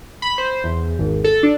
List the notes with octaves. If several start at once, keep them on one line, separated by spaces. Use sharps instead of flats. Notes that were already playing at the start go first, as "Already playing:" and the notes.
B5
C5
E2
G#1
A4
D4